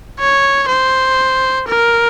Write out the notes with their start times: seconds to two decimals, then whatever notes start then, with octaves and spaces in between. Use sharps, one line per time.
0.19 C#5
0.69 C5
1.67 A#4